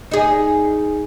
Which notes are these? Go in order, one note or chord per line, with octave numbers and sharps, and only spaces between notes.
D#4 G#4